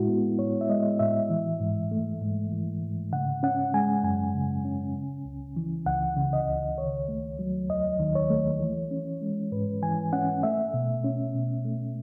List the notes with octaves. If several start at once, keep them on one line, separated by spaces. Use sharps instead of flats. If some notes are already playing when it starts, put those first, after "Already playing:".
Already playing: A2 G#3 E4 F#4
B3
A2 C#5
E5
G#3 D#5
A2 E5
E3
G#2
A3
G#2
E3
G#2
C#3 F#5
C#4 F#5
G#3 G#5
F#2 G#5
C#3
C#4
C#3
C#2
E3
C#2 F#5
C#3
D#5
C#2
D#3 C#5
A3
F#3
D#2 D#5
D#3
C#5
A3
E3
C#4
G#3
G#2 B4
E3 G#5
C#4 F#5
A3 E5
B2
C#4
B2
A3